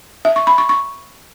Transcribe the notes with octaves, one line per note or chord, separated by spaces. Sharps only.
E5
C#6
B5
C#6
C#6